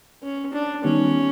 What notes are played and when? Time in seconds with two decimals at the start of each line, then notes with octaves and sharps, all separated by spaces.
0.23 C#4
0.53 D4
0.84 D#3 G3 B3 C#4 D#4 G4